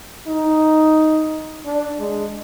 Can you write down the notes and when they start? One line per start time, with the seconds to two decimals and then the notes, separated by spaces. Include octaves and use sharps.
0.27 D#4
1.65 D4
2.00 G#3